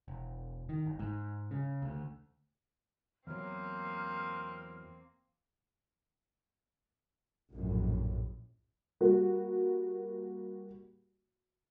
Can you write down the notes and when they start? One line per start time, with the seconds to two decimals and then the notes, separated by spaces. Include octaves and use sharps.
0.08 E1
0.69 D#3
0.86 G1
0.99 G#2
1.51 C#3
1.82 D2
3.27 E2 F#3 A#3 C4 F6
7.53 A#1 F#2 A2
9.01 G3 A#3 F#4